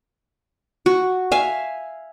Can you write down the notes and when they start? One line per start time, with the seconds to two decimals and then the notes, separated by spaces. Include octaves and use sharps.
0.86 F#4
1.32 E5 F5 G#5